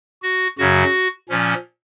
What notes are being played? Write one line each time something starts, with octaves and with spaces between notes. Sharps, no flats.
F#4
F#2 C#3 F#3 F#4
A#2 F3 C#4